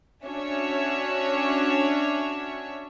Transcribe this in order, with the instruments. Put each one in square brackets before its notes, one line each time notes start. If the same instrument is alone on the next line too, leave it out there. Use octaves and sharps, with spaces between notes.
[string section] C#4 D4 F#4 C#5 E5